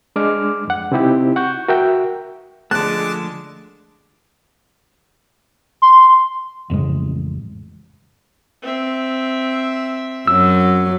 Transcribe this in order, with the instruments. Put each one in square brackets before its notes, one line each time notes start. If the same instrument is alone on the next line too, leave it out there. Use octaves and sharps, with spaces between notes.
[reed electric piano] G#3 D4 D6 F6
F2 F#5
C3 C4 D#4 E4 G4
F#5 C#6 G6
F#4 A#4 E5 G5
[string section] D3 G#3 [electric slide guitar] F3 A3 [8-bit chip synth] A5 D6 [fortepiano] F#6
[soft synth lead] C6
[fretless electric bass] A1 F2 C#3 G#3
[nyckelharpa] C4 E5
[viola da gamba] F#2 F#3 [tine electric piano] E6